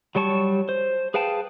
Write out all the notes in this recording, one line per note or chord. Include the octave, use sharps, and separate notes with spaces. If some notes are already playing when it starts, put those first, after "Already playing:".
F#3 G3 C#5 A5 C#6
C5
G#4 B4 F5 G5 A5